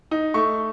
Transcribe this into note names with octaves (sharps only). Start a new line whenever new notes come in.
D#4
A3 C#6